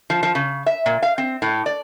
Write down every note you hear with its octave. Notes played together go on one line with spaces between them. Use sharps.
F3
F3
C#3
E5
A#2
F5
C4
A2
D5